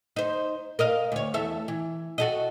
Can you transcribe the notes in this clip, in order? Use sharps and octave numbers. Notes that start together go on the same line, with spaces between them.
D#4 C5
A#4 D#5 F5
D2 C#5
E2 A4 E5
E3
F#4 A4 D#5